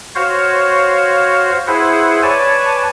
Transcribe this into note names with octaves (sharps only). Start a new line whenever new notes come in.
F#4 C5 C#5 F5
E4 G#4 B4 C5 F#5
B4 C#5 D5 G#5 A5